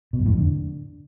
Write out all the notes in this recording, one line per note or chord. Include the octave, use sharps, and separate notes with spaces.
B2
F#2
A2
F2
D3